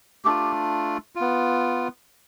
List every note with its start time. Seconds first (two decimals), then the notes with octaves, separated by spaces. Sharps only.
0.25 A3 D4 F4 G4
1.15 F4
1.21 B3